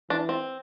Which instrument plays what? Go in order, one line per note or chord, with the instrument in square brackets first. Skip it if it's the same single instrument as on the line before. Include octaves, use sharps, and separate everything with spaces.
[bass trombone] E3 [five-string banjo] D4
[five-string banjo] C4